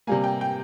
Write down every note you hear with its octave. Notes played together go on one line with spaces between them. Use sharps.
C3 G3 A#3 G#5
G5
G5